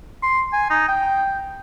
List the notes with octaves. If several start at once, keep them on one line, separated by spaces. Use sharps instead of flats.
C6
G#5
D#4
G5